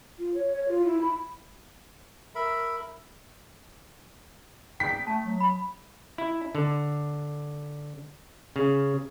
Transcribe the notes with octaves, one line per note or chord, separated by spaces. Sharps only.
F4
C#5
C#5
F4
E4
B5
A#4 E5 B5
G5 B6
A3 A5
F#3
B5
E4
D3
C#3